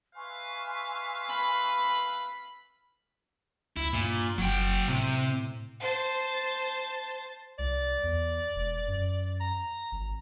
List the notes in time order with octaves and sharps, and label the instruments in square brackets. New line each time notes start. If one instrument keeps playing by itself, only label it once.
[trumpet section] B4 E5 F5 [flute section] G#5 C6 C#6
[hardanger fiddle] B5
[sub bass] D2 [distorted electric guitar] E4
[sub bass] G2 [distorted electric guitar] A#2
[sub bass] F#1 [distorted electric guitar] F#3 G5
[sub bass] A2 [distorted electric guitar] C3
[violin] C5 A5
[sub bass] C2 [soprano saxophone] D5
[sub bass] E2
E1
F#2
[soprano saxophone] A#5
[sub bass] G#1